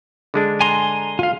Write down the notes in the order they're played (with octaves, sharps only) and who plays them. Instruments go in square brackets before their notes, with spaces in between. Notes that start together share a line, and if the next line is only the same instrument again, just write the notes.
[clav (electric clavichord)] D3 G#3 D4
[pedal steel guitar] G#5 A#5 C6
F4 F5